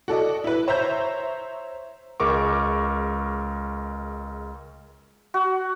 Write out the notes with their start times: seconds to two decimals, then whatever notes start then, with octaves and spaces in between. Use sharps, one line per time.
0.08 F#4 A4 D5 D#5
0.44 E4 B4
0.68 C5 C#5 E5 A#5 G6
2.20 C#2 G#3 A#4 C#6 D6
5.34 F#4